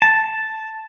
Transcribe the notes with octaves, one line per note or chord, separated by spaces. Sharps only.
A5